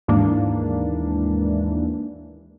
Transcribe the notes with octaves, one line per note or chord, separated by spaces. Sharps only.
D#2 G#2 E3 A#3 D4